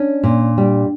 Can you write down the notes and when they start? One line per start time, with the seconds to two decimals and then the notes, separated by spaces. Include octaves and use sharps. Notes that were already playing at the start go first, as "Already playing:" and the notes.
Already playing: C#4 D4
0.23 A#2
0.58 G3